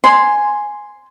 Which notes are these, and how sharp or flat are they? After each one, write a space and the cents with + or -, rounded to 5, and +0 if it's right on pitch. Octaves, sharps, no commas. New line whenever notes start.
G#5 +0 C6 +0